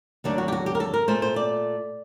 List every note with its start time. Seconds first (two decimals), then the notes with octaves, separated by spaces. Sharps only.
0.24 D#2 D3 F#3 A3 D4
0.38 F#4
0.48 G4
0.52 F#4
0.66 G4
0.75 A#4
0.80 A4
0.94 A#4
1.08 A#2 A3 C5
1.22 C5
1.36 D5